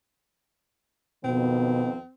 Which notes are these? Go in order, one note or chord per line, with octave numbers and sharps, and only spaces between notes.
F2 B2 D#3 B3 C4